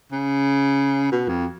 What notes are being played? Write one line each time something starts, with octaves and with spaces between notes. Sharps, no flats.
C#3
B2
F2